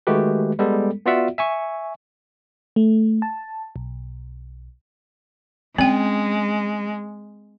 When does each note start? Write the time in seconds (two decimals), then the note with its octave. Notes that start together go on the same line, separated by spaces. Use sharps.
0.07 D#3 G#3 A3 F#4 G4 B4
0.59 G3 G#3 B3 A4
1.06 B3 F4 F#4 D5 E5 F#5
1.38 E5 G#5 C#6
2.76 A3
3.22 A5
3.76 B1
5.78 G#3 C4 C#4 G5